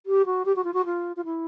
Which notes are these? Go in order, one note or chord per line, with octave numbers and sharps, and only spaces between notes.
G4
F#4
G4
F#4
F4
F#4
F4
F4
E4